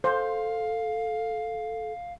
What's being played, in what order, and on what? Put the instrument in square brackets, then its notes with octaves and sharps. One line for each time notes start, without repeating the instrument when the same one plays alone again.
[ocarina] A4 [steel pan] C5 [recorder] F5